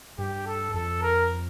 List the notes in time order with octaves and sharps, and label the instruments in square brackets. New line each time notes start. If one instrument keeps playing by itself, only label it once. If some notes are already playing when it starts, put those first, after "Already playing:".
[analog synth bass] G2 [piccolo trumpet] G4
[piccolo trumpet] A4
[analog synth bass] F2 [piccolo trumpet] A4
[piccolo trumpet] A#4